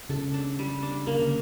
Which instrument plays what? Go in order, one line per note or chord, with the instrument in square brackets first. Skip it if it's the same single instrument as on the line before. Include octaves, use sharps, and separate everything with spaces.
[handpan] C#3 [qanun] A4
[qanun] D4
G3
D4
[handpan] C#3 [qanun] A#3
[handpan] D3